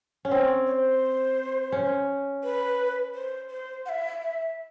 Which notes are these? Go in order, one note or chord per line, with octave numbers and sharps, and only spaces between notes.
C#4
C4 C#5
C#5
C5
C#4
B4
C5
C5
F#5
E5
E5